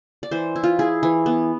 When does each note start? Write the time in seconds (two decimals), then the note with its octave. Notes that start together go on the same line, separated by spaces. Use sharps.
0.23 D5
0.31 E3 C5
0.56 E4
0.64 F4
0.79 E4 G#4
1.03 E3
1.26 B3